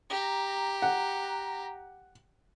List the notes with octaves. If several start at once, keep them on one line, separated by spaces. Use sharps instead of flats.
G4 A#5
F#5